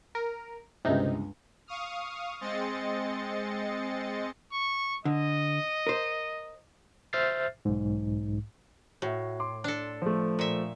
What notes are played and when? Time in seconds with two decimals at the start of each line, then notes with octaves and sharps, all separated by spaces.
0.15 A#4
0.85 G1 C#2 C3 D#4
1.67 F5 C#6 D#6 F6
2.41 G#3 C4 D#5 C6 A6 C#7
4.52 C#6
5.05 D3 D#5
5.87 A#4 C5
7.13 C5 E5 F6 G6 A6 C7
7.65 B1 G#2
9.02 A2 F#4 E5
9.40 C6 D6
9.64 D4 A4
10.02 F3 A3
10.39 A#2 E5